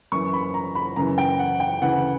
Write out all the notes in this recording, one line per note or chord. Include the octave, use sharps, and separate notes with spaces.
F#2 E3 C#6
B5
A#5
B5
F#2 C#3 E3 A#5
G5
F#5
G5
D2 C#3 E3 F#5